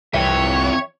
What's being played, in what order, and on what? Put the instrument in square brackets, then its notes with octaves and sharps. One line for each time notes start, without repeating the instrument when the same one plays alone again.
[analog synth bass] C2 [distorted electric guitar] F2 E3 [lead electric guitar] C#5 [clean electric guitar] E5 G5